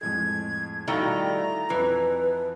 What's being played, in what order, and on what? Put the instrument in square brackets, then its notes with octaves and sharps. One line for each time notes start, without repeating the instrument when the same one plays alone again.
[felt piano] F2 A2 G#3 [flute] G#6
[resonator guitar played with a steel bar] D#3 G3 A3 [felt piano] E4 F#4 F5 [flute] A#5
[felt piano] F2 F3 [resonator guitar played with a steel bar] E3 [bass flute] B4